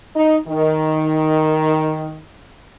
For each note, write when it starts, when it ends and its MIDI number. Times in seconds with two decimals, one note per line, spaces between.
0.15 0.37 63
0.48 2.19 51